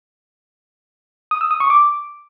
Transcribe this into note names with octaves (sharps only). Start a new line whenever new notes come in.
D#6
E6
D#6
C#6
D6